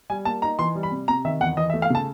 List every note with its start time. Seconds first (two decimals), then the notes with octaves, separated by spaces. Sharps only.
0.10 G3 G#5
0.25 A#3 A5
0.42 D#4 A#5
0.59 E3 C6
0.75 G3
0.83 B5
0.91 C3
1.08 C3 A#5
1.25 D#3 E5
1.40 E2 F#5
1.57 E3 D#5
1.70 E5
1.74 A3
1.82 F5
1.90 C#3 A5